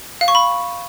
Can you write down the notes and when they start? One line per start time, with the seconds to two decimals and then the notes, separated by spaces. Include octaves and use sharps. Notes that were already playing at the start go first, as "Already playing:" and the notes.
0.21 F5
0.28 C#6
0.35 B5